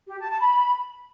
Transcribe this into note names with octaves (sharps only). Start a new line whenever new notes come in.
G4
A5
A5
B5